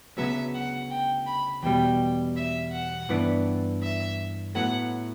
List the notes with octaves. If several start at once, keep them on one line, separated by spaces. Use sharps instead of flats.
D2 C#3 F#3 B3 E5
F#5
G5
B5
E2 B2 G3 G5
E5
F#5
G2 E3 B3 D4
E5
A2 F#3 B3 F#5